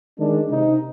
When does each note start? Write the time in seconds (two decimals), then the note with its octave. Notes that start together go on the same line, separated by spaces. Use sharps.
0.18 D#3 G#3 D4
0.50 C3 D#4